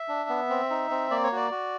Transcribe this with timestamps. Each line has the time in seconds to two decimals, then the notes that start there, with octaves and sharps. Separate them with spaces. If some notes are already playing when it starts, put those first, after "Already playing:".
Already playing: E5
0.08 D4
0.29 B3
0.49 C4
0.70 D#4
0.91 C4
1.11 A#3 D5
1.24 C#5
1.32 F#4 D5
1.51 F#4